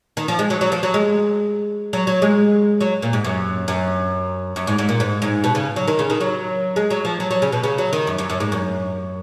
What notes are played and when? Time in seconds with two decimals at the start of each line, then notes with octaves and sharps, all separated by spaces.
0.17 D#3
0.28 F3
0.39 G#3
0.50 F#3
0.61 F#3
0.72 F3
0.83 F#3
0.94 G#3
1.93 F#3
2.07 F#3
2.22 G#3
2.81 F#3
3.02 A#2
3.13 G#2
3.24 F#2
3.68 F#2
4.56 F#2
4.67 G#2
4.78 G#2
4.89 A#2
5.00 G#2
5.22 G#2
5.44 B2
5.55 C#3
5.76 F#3
5.88 D#3
5.99 C#3
6.10 D#3
6.21 F#3
6.76 G#3
6.90 F#3
7.05 F3
7.20 F#3
7.31 F#3
7.42 C#3
7.52 B2
7.63 C#3
7.78 F#3
7.93 D#3
8.07 F#2
8.18 F#2
8.30 F#2
8.40 G#2
8.52 F#2